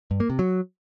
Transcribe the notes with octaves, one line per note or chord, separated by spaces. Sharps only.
G2
A#3
C3
F#3